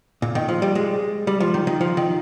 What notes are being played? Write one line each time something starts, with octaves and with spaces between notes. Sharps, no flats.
A#2
D#3
F3
G3
G#3
G3
F3
D#3
D#3
F3
D#3